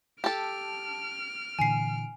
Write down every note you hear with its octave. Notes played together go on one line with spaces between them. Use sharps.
G4 A4 A5 F6 D7
A#2 D3 E3 G#5 C7